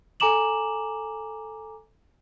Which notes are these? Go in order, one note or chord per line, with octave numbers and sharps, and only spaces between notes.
A4 G#5 A#5 D6 E7 F#7